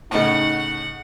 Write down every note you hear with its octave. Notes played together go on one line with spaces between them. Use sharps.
A2 C#3 D#4 D#5 F#5 A5